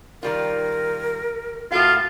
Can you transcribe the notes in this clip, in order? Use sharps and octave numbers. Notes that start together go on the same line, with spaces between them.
D#3 G3 F4 A#4
A2 F4 F#4 A4 F5